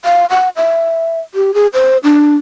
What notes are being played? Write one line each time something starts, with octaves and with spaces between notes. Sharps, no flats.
F5
F#5
E5
G4
G#4
C5
D4